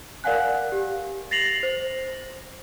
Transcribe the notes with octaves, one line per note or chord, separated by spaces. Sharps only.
A#4 D5 F5 F#5 G#5 F#6
G4
A6 A#6 C7 F7 F#7
C5